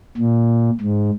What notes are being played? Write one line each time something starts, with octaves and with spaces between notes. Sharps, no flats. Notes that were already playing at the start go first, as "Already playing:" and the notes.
A#2
G#2